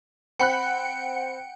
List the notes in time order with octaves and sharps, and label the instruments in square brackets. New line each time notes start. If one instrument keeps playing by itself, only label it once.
[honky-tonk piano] C4 B5 F#6 [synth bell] F#5 G5 C#7